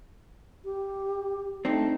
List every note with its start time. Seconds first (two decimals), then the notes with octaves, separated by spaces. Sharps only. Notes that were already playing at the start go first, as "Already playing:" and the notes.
0.65 G4
1.65 A3 C4 D4 D#4